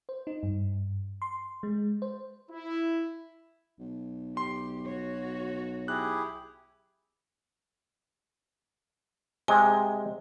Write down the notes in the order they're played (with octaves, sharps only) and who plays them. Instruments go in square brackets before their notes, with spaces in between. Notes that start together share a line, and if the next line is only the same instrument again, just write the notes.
[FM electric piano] C5
D#4
G2
C6
G#3
C5
[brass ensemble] E4
[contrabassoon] B1
[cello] G4 [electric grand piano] C6
[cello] F#4 C#5
[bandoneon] E4 G4 G#4 [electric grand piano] F#6
[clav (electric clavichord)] C3 G#3 [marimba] G#5